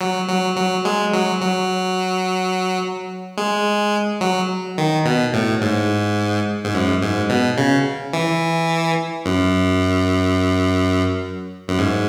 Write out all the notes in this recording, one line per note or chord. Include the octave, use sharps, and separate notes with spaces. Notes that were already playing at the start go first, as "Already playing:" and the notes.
F#3
F#3
F#3
G#3
F#3
F#3
G#3
F#3
D#3
B2
A2
G#2
G#2
F#2
G#2
B2
C#3
E3
F#2
F#2
G#2